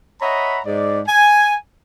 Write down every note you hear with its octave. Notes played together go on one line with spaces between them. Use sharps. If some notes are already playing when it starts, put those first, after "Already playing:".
C#5 D#5 E5 F#5 A#5 B5
G#2 D5
G#5